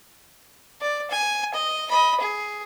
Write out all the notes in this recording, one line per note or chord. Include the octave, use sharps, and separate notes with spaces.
D5
G#5
D#5
D#5 B5
G#4